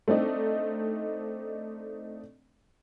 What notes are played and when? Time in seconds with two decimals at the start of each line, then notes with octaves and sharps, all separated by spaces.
0.08 A3 C4 D4 D#4